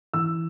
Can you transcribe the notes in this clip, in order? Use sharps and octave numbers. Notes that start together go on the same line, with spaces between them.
E3 E6